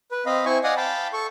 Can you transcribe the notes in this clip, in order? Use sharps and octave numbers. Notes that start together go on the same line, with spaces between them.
B4
C4 D#5 F5 B5
C4 E4 C5 G#5 C#6
D5 D#5 F5 F#5 G#5 D#6
F5 G5 A5 B5
A4 C#6